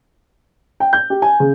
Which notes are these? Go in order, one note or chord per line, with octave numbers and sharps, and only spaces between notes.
G5
G6
G4
G#5
C#3